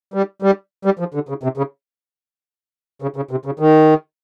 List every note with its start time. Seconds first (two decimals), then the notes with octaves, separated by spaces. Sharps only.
0.14 G3
0.42 G3
0.85 G3
0.99 F3
1.14 D3
1.29 C#3
1.43 C3
1.57 C#3
3.02 C#3
3.16 C#3
3.31 C3
3.46 C#3
3.59 D#3